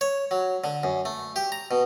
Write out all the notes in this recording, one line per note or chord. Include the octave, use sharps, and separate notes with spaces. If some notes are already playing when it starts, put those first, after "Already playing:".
C#5
F#3
D3
F#2
A3
G4
A#5
B2